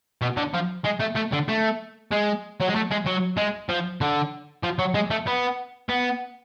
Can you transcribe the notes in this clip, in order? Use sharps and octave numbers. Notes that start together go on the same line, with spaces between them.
B2
D3
F3
G#3
A3
A3
D3
A3
G#3
F#3
G#3
A3
G#3
F#3
G#3
F3
D3
F3
F#3
G#3
A3
B3
B3